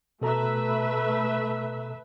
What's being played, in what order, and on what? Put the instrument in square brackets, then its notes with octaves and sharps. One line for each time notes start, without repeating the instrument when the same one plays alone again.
[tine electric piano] B2 A4 A#5 [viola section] A3 B4 E5